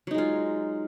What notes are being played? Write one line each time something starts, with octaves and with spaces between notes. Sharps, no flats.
F#3 G#3 D#4 F4